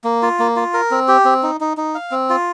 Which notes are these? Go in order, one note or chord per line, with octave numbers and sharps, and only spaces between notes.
A#3
F4
A#3
F4
A#4
C4
G4
C4
D#4
D#4
D#4
F5
C4
F4